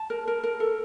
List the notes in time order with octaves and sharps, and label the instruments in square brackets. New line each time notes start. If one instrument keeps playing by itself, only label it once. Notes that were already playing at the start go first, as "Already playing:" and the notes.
Already playing: [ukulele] A5
A#4
A#4
A#4
A4